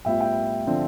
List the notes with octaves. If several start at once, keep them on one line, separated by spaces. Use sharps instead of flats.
A2 G3 B3 F4 E5 G5
E5 G5
D3 F3 C4